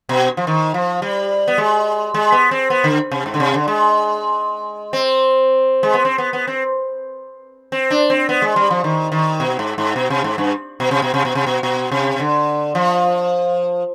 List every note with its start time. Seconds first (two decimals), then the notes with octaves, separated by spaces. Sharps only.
0.09 B2
0.37 F3
0.47 D#3
0.74 F3
1.02 G3
1.48 B3
1.58 G#3
2.14 G#3
2.32 B3
2.51 C4
2.70 B3
2.84 D3
3.12 C3
3.26 G#2
3.34 D3
3.40 C3
3.54 D3
3.68 G#3
4.93 C4
5.83 G#3
5.94 B3
6.05 C4
6.18 B3
6.33 B3
6.47 C4
7.72 C4
7.91 D4
8.10 C4
8.29 B3
8.42 G#3
8.56 G3
8.71 F3
8.84 D#3
9.12 D#3
9.40 B2
9.59 G#2
9.78 G#2
9.96 B2
10.10 C3
10.24 G#2
10.38 G2
10.80 B2
10.91 C3
11.02 B2
11.14 C3
11.25 B2
11.35 C3
11.46 B2
11.63 B2
11.91 C3
12.20 D3
12.75 F3